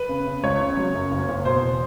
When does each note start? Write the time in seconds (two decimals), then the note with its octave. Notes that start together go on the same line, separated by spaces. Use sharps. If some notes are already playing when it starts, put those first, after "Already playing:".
Already playing: B4
0.09 C#3
0.27 C#3
0.43 C#2 C#5
0.60 C#3
0.77 F#3
0.94 F#2
1.11 F#1
1.28 F#1
1.45 B2 C5
1.62 E2